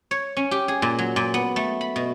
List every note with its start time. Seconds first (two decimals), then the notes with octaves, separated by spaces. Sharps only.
0.11 C#5
0.37 C#4
0.51 G4
0.68 G#4
0.82 A#2
0.98 F#3
1.16 A#2
1.34 B3
1.56 A3
1.81 B5
1.96 B2